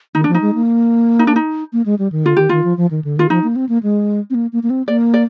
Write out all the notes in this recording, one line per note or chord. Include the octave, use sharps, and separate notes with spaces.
D#3 D#4
F3 D4
D#4
G#3
A#3
D#4
D4
D#4
A#3
G#3
G3
D#3
D3 F4
D#3 G4
D#3 F4
F3
F3
D#3
D3
D#3 F4
F3 D#4
A#3
C4
A#3
G#3
C4
A#3
A#3
A#3
C4
A#3 D5
D5